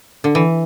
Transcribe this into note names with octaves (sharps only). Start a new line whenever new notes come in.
D3
E3